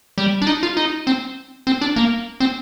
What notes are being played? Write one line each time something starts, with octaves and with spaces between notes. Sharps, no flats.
G3
D4
D#4
F4
D#4
C4
C4
D4
A#3
C4